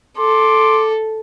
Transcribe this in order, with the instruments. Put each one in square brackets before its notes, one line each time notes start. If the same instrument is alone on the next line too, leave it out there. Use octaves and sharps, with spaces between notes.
[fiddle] A4 [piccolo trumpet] C6 [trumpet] D6